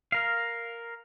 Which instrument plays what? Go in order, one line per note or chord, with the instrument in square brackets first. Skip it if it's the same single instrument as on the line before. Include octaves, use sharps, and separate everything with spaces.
[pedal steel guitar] A#4 F5